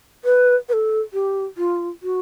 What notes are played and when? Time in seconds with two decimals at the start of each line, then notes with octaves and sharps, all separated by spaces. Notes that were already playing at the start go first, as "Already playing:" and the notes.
0.25 B4
0.69 B4
0.73 A4
1.14 G4
1.57 F4
2.03 F#4